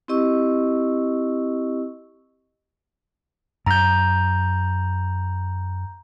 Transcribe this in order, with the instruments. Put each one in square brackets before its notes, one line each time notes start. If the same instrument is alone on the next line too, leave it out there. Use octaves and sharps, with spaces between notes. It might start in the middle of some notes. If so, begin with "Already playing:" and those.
[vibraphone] C4 E4 G4 D#5 C#6 E6
[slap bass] F#2 [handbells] A#5 G6